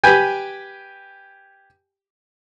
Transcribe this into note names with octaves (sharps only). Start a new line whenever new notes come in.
G4 B4 G5 G#5